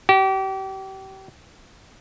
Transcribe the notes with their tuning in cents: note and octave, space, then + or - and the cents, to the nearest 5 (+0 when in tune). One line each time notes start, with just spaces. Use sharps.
G4 -35